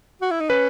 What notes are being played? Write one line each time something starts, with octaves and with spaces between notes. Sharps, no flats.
F#4
E4
D#4
C#4 B4